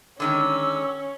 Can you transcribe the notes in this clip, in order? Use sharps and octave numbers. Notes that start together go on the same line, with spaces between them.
D3 D#3 G#3 C#4 E6